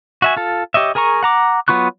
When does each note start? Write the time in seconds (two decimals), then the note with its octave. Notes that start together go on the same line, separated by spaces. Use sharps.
0.22 F#4 E5 G#5
0.37 F4 A4
0.74 G4 C#5 D#5 E5
0.95 G#4 A#4 G#5 A#5 C#6
1.23 F#5 A#5 D6
1.68 F#3 B3 F4 C#6 F#6